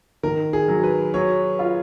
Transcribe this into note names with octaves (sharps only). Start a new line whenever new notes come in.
D#3 A#4
G#4
F#3
B4
F#3 C#5
F4